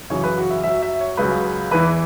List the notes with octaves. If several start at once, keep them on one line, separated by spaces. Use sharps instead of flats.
F#2 C#3 E3 C#5
B4
F#4
E5
F#2 F#3 E5
E5
C#5
C#2 C#3 F#3 B4
E2 E3 B4